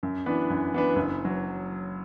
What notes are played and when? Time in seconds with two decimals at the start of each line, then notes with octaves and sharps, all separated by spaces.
0.03 F#2
0.26 E3 B3 D4 B4
0.50 F#2
0.73 E3 B3 D4 B4
0.96 F#1
1.25 F#3